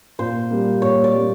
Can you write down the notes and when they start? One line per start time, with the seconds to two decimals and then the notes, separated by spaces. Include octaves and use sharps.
0.19 A#2 C5
0.51 G3 A#3
0.82 A#2 C#5
1.04 D5
1.15 G3 A#3